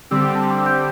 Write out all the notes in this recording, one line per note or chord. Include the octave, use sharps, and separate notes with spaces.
D3 G3 C4 G4 E6
A5
C6
D6
E6
G6